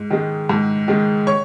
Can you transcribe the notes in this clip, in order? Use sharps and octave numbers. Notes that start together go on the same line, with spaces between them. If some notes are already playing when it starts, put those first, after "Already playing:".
Already playing: G#2
D#3 G#3
G#2
D#3 G#3
C#5 C#6